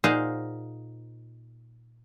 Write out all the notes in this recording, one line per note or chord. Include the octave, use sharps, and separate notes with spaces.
A#2 D#4 G#4 C5 F5 F#5